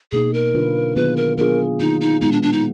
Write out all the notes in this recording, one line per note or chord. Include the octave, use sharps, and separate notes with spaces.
B2 A#3 D#4 G#4
A#4
D3 F#3 D4 F4 B4
D#3 F#3 B3 F4 G#4 B4
A#4
F#3 B3 D4 F4 G#4 A#4
D#3 A#3 D#4 F4
D#4
A#2 G#3 B3 D#4
D4
D4
D#4